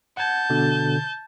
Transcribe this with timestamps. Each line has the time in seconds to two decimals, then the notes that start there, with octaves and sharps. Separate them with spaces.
0.17 F#5 A5 G6 G#6
0.50 B2 D3